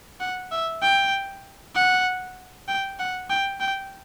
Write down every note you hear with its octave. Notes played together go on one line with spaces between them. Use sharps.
F#5
E5
G5
F#5
G5
F#5
G5
G5